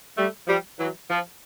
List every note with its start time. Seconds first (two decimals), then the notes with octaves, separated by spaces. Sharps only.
0.16 G3 A3
0.47 F3 G3
0.78 E3 F#3
1.09 F3